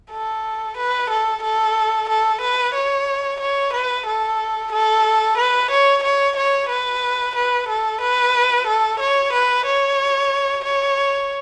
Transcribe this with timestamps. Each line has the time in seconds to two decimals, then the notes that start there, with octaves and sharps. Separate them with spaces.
0.11 A4
0.77 B4
1.10 A4
1.42 A4
2.09 A4
2.41 B4
2.74 C#5
3.40 C#5
3.73 B4
4.06 A4
4.72 A4
5.37 B4
5.70 C#5
6.03 C#5
6.36 C#5
6.69 B4
7.35 B4
7.68 A4
8.01 B4
8.67 A4
9.00 C#5
9.32 B4
9.65 C#5
10.64 C#5